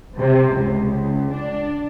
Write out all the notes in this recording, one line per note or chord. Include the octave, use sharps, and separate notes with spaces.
C3
C#2
D4